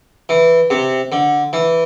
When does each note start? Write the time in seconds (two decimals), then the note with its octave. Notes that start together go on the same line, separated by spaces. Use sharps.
0.29 E3
0.70 C3
1.12 D3
1.53 E3